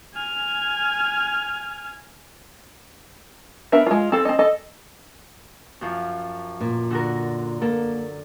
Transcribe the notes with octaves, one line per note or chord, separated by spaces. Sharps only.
G#5 F6
B3 D4 A#4 E5
G#3 F4
C4 A4
C4 D#5
A4 D#5
F#2 F3
A#2
D3 F#4 A#4
A#3 A4